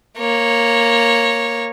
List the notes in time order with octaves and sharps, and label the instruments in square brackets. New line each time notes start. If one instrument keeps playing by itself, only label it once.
[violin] A#3 C#5